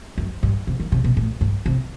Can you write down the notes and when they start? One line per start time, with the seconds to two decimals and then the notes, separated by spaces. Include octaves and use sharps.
0.18 F#2
0.43 G2
0.67 C3
0.80 D#3
0.92 C3
1.04 B2
1.17 A2
1.41 G2
1.66 C3